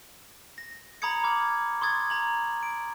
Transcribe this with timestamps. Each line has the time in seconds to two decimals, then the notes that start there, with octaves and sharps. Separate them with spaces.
0.58 A#6
1.02 A#5 B5 D#6 G#6 C#7
1.23 B5 D6 F6 G#6
1.81 C6 C#6 D#6 G#6 A6
2.10 A#5 F#7
2.63 D7